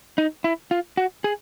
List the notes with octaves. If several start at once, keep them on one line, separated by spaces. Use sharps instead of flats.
D#4
E4
F4
F#4
G#4